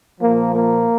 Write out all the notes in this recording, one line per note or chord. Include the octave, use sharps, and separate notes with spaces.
A#2 F3 A#3
A#3